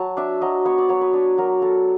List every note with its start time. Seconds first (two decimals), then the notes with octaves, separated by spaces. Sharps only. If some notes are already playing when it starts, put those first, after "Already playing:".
Already playing: F#3 A5
0.17 D4 E5
0.41 F#3 D#5
0.65 B3 C#5
0.78 D5
0.89 F#3 C#5
1.01 B4
1.13 D4
1.38 F#3 A#4
1.62 B3 A4